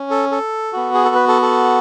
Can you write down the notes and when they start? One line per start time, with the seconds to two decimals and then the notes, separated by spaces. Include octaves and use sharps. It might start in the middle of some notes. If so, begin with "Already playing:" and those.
Already playing: C#4
0.10 A4
0.31 A4
0.73 B3 F#4
0.94 G#4
1.05 A4
1.15 B4
1.28 A4
1.42 A4